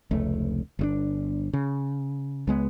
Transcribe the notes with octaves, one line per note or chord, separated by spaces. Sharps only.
F1 C#2 A3
G1 C3 D4
C#3
C#2 G#3 B3